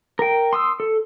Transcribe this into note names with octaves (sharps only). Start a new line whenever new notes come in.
A#4 G5
C6 D#6 E6
A4